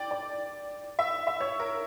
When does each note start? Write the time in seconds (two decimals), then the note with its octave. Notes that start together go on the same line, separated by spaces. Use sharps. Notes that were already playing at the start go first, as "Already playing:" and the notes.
Already playing: D5 G5
0.11 D5
0.99 E5
1.27 E5
1.41 C#5
1.60 A#4